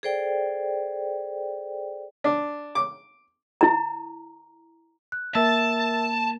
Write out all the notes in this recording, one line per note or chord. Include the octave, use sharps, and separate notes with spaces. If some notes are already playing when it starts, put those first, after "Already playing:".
G#4 A4 C5 D5 G5
D4
D6
E4 A#5
F#6
A#3 A#4 E5 A5 E6